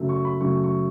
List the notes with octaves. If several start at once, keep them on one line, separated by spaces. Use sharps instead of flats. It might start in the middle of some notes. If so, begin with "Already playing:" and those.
Already playing: F#2 C#3 F#3 A3
C#6
B5
F#2 C#3 F#3 A3 C#6
C#6